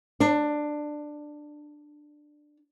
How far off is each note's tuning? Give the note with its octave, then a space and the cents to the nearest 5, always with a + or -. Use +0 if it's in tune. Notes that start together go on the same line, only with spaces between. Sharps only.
D4 +15